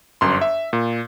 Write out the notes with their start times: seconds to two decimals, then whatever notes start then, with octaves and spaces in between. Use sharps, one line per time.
0.21 G1 F#2 C6
0.41 E5
0.73 A#2